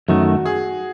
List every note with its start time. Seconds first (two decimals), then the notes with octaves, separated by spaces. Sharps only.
0.08 F#2 D#3 A3 F#4
0.45 G#4